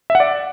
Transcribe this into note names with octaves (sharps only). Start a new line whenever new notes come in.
E5
F#5
D5